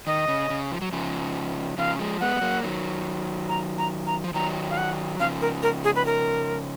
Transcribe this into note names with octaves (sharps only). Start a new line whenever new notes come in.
D#3 D#5
C#3
C#3
F3
F#3
C#3 F3
C#3 F3 F5
F3 G#3
G#3 B3 F#5
G#3
F#3 A#3
D#3 F#3
A#5
A#5
A#5
F3
D#3 F#3 A#5
F5
F#5
C#3 F3 F5
A#4
A#4
G#4
B4
A#4